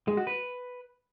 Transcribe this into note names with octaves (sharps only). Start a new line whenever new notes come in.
G#3
F#4
B4